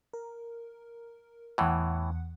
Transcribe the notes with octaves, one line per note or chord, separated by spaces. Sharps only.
A#4
E2 A2 E3 F#5